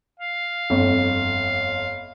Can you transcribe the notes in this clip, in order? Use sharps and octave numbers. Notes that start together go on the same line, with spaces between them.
F5
G1 F2